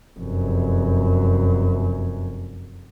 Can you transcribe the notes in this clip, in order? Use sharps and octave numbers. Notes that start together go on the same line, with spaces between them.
F1 F#2